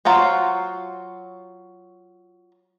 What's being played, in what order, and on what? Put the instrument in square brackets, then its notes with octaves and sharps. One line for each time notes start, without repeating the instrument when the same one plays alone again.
[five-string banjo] F#3 F4 F#4 C5